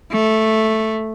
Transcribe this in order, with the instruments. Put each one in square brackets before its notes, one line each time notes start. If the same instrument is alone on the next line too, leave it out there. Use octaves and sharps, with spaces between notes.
[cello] A3